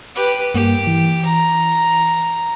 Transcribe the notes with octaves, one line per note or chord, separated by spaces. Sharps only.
G4 B4
G2 A#3 G4
E3
A#5